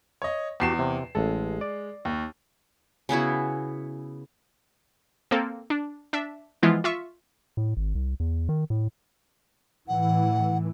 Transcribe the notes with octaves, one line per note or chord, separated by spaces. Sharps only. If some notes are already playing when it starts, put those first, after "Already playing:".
C#5 D#5
E2 F#4 G4 A5 C7 E7
C3
A1 G#3 A4
D5
D#2
C#3 B3 E4 F#4
A#3 C4 A4
D4
D4 E5
E3 F3 G#3 B3 E4 F4
F4 E5 C#6
A2
G#1
C2
E2
D#3
A2
A2 E3 F#5